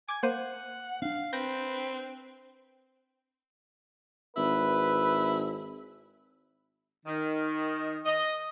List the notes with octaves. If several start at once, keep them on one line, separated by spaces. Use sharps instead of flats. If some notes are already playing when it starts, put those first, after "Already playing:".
G#5 D6 G#6
A#3 C5 F#5 D#7
C#4 D4 F5
C4 B4 G6 A#6
G#1 E4 B4
D#3
D#5